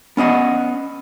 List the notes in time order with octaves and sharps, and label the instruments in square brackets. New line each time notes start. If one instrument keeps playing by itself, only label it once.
[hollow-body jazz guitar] B3 C#4 D#5 F#5